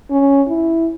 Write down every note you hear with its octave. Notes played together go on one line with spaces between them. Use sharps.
C#4
E4